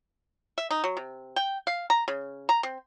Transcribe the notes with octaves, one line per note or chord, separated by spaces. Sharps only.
E5
D#4
F#3
C3
G5
F5
A#5
C#3
A#5
C4